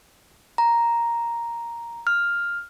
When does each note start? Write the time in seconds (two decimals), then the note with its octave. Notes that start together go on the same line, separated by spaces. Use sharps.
0.58 A#5
2.07 F6